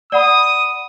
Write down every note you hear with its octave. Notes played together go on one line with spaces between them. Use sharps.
D5 F#5 B5 D#6